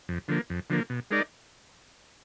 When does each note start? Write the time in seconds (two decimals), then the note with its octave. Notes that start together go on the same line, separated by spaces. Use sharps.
0.09 F2
0.28 D3 F3 A#3
0.50 F2
0.70 D3 F3 A#3
0.90 B2
1.11 G#3 D#4 A#4 D5